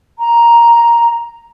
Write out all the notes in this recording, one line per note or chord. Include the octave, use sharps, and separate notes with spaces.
A#5